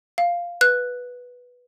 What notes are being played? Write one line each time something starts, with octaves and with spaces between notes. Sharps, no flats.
F5
B4 F#6